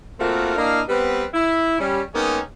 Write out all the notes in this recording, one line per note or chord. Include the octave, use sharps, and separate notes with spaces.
A3 A#3 C4 F4 F#4 A#4
A#3 D4 E4 D#5 F5
G3 B3 C4 B4
E4
G3 C#4
D#3 G#3 A#3 B3 C#4 D#4